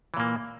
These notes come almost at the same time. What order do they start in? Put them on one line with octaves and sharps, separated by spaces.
E3 A#2 A#3